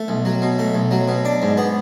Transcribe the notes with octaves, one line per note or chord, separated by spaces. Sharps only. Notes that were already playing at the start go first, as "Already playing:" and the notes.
Already playing: A3
B1
F#3
B2
A3
B1
F#3
B2
D4
G#2
B3